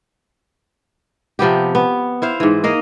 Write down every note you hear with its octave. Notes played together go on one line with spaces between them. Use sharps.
C3 F3 B3 G4
B3
E4 C5 F5
G#2 E3
A#3 D#5 F5